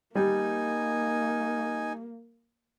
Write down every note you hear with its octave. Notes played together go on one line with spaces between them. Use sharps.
G3 A#3 D#4 G#5